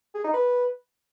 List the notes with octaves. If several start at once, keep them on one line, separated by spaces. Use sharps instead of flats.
G#4
D#4
B4